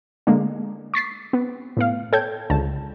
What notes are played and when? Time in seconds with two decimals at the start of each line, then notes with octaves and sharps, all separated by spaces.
0.27 D3 G#3 A#3 D4
0.94 C#6 A6 B6 C7
1.33 B3
1.77 A2 B3 F5
2.13 A4 C#5 G5 G6 G#6
2.50 C#2 D3 A5